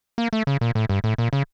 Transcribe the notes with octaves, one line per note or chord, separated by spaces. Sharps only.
A#3
A3
C#3
A#2
A2
G2
A2
A#2
C#3